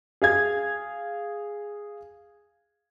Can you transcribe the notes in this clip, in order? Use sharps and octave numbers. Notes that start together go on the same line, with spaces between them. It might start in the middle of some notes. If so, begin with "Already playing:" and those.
G#4 F5 G#6